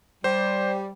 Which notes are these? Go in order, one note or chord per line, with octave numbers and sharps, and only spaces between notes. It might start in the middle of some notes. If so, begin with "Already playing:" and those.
G3 C5